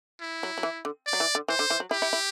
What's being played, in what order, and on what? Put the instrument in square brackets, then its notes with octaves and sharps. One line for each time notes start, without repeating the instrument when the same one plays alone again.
[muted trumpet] E4
[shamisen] F#3
F#3
E3
D3
[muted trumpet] D5
[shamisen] F#3
E3
D3
[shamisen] E3 [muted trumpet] C5
[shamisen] D3
E3
F#3
[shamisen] E4 [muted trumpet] G4
[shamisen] E4
E4